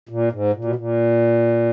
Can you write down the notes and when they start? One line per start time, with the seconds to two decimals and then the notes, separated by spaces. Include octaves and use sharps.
0.09 A#2
0.32 G#2
0.54 A#2
0.64 B2
0.76 A#2